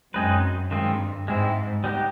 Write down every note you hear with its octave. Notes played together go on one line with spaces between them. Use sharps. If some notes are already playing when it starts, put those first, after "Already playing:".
F#2 G#3 C4 D#4 G#4 B4
G2 D#3 G#3 C4 F4
G#2 G#3 C4 E4
G3 B3 D#4 G4